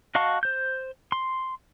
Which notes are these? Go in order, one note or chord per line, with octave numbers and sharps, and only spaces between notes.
F#4 D#5 F5 A5 C#6
C5 G6
C6